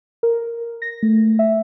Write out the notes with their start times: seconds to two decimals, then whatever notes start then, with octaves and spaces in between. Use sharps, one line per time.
0.23 A#4
0.82 A#6
1.03 A3
1.39 E5